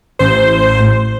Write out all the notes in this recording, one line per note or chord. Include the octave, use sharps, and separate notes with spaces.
A1 C5